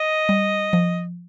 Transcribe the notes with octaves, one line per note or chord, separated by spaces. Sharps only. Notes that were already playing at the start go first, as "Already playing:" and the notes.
Already playing: D#5
G3
F3